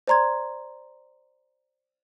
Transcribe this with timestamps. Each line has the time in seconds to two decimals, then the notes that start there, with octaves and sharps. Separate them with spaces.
0.08 C5 D5 A#5 C6 G#6